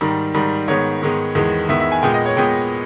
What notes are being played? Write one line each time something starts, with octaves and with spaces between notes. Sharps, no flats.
G#2 D#3 G3
G#2 D#3 G3
G#2 D#3 G#3 B3 C#5
G#2 D#3 G#3 B3
E2 D#3 G#3 B3
E2 D#3 G#3 B3 E5
E5
G#5
A#2 G#3 B3 G5
D#5
C#5
A#2 G#3 B3 G5